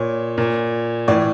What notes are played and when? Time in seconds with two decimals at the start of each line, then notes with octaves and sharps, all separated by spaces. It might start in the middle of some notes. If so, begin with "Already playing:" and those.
Already playing: A#2 C#5
0.38 A#2
1.08 A2 E3 D5